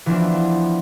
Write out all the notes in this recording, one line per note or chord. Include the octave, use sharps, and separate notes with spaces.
E3 F3 B3 D4